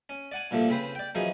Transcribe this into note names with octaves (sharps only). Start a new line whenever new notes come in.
C#4
D5 F#5 G#5
G2 A#2 F3 A3
C#3 C4 B4 C5
D5 G5
F#2 E3 F3 D#4 G#4